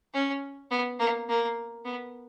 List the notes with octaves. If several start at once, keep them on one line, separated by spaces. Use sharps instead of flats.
C#4
B3
A#3
A#3
B3